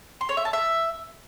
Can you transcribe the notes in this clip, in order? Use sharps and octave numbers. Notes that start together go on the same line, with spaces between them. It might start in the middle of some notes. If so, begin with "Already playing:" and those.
C6
C#5
E5
A5
E5